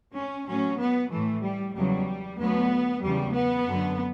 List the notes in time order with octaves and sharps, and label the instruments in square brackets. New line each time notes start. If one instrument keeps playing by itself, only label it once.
[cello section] C#4
A2 F#3 C#4
B3
A2 E3 A3
G3
E2 C#3 F#3 G3
D2 D3 F#3 B3
E2 C#3 F#3 G3
B3
F#2 D3 F#3